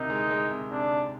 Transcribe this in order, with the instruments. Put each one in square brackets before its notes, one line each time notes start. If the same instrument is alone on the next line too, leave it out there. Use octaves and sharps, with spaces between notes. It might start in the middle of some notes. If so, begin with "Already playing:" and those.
Already playing: [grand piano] D2 C3 D#3 [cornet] D#4
[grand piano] G#3
G#3
C3
[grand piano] C3 [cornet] D4
[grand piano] C3